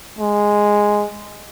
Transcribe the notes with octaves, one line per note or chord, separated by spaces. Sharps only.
G#3